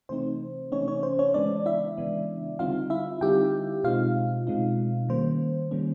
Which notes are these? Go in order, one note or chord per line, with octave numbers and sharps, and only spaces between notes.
C3 E3 A3 C4 D#4 C5
C3 E3 A3 C4 C#4 D#4 C#5
C#4 C#5
C5
C#4 C#5
C#3 E3 G#3 B3 D4 D5
E4 E5
C#3 E3 G#3 B3
D3 G3 C4 D#4 F4 F5
E4 E5
D3 G3 C4 D#4 G4 G5
B2 G#3 C4 D#4 F4 F5
B2 G#3 C4 D#4
D#3 G3 A#3 C#4 C5
D#3 G3 A#3 C#4